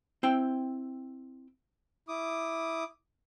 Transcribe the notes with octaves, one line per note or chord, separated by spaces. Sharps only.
C4 E4 G5
E4 D6 D#6